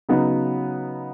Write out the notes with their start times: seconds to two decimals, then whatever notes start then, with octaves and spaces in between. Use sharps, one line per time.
0.09 C#3 F#3 B3 D#4